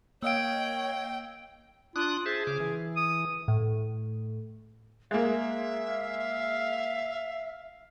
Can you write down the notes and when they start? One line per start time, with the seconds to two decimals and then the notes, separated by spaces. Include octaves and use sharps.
0.23 A#3 C#5 D#5 F5 G5 E6 D7
1.96 D4 F4 D#6 F#6
2.26 G#4 C5 E5 A5
2.47 C#3 D6 F6
2.60 E3
2.96 D#6
3.48 A2
5.11 G#3 A#3 E5
5.88 F5